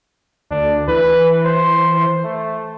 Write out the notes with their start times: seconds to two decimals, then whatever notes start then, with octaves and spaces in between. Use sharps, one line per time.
0.51 D2 D4
0.88 E3 B4
1.45 C5
2.24 A3